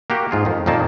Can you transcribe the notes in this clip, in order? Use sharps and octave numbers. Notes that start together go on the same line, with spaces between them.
A#3 F#4 G4
G#2 F4 G#4
F2 D#3
F2 A#2 D#3 A#3 A5